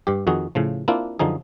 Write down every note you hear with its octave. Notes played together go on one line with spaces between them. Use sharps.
G2 G4
F2 D#3 F#4 G#4
A2 C#3 F3
A#3 C4 D4 E4 F4
F#2 D3 F3 D#4 G#4